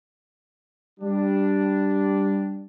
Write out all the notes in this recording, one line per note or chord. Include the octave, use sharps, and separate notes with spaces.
G3 D4